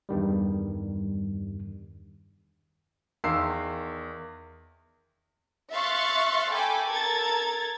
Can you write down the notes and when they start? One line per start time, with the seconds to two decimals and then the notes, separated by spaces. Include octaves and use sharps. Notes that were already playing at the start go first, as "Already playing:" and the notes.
0.09 E2 G2 D#3 G3
3.24 E2 D#3 F5 C6 E6 C7
5.73 E5 F5 C6 C#6 F#6 A6
6.52 A4 G5 G#5 B5 D6
6.88 A4 A#4 A#5 G#6 A6